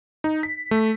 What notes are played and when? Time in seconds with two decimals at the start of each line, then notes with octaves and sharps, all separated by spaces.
0.24 D#4
0.43 B6
0.71 A3